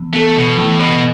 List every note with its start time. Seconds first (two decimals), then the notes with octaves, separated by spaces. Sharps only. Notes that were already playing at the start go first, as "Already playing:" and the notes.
Already playing: E3 B3
0.13 A3 B3 A4
0.36 B2
0.57 A2 E3
0.79 B2